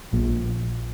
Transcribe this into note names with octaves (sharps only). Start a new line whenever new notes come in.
A#1 A#2